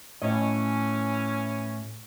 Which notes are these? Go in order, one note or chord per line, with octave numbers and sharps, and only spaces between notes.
A2 E3 C#4 C#5 D#5